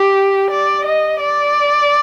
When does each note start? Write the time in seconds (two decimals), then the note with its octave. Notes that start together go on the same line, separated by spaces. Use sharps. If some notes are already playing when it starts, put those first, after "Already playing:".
Already playing: G4
0.51 D5
0.85 D#5
1.20 D5